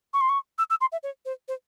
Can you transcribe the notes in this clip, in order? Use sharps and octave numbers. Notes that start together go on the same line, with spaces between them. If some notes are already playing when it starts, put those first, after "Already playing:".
C#6
C6
C#6
E6
E6
C6
E5
C#5
C5
C5